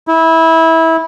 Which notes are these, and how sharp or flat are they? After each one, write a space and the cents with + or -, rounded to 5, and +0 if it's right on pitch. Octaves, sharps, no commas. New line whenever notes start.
E4 -20